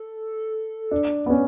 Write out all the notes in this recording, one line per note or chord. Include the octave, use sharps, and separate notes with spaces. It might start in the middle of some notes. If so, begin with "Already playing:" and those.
Already playing: A4
D4
B3
C#4